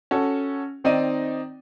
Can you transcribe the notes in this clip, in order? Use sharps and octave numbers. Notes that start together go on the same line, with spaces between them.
C#4 F#4 A4
D#3 C4 D#4 D5 D#7